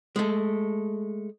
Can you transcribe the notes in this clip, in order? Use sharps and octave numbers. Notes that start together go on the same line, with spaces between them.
G#3 A3